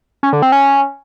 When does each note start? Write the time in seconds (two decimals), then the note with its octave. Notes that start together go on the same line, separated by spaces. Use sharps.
0.23 C#4
0.33 D3
0.42 C4
0.52 C#4